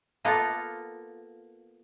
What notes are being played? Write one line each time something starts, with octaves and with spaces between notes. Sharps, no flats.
A#3 B3 F4 A4